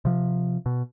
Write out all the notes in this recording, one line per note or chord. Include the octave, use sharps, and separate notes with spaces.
C3 F3
B2